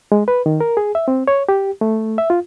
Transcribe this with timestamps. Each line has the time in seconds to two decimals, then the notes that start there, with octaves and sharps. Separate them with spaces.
0.12 G#3
0.28 B4
0.46 D#3
0.60 A#4
0.77 G#4
0.95 E5
1.08 C4
1.28 C#5
1.49 G4
1.81 A3
2.18 E5
2.30 F4